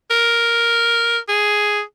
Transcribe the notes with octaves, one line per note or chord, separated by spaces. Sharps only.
A#4
G#4